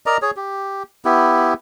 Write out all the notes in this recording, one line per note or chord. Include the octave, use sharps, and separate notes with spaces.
A#4 D5 D#5 A#5
G#4 C#5
G4
B3 E4 G4